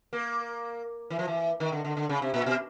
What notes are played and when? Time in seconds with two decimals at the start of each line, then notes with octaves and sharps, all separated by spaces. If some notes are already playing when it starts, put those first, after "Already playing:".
0.13 A#3
1.10 E3
1.19 F3
1.28 E3
1.60 D#3
1.72 D3
1.85 D3
1.97 D3
2.09 C#3
2.22 C3
2.34 A#2
2.46 B2